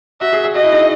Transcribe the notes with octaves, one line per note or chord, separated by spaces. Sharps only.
F#4 E5
G#4
G#4
F#4 D#5
E4
D#4